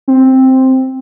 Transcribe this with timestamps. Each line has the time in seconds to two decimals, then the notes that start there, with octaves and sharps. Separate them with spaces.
0.08 C4